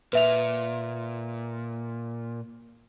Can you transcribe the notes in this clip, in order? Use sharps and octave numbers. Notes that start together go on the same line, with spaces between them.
A#2 B4 E5 F7